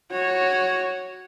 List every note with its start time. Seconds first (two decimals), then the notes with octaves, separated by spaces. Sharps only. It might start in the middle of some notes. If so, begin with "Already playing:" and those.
0.11 F#4 C#5